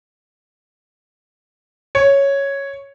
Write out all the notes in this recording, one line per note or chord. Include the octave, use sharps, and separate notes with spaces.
C#5